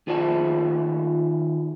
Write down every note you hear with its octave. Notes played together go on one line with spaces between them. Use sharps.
D#2 F4 G#4 D5 A5